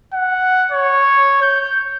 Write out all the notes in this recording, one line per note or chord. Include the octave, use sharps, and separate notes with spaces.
F#5
C#5
G6